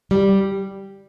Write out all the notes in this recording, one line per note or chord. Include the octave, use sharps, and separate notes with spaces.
G3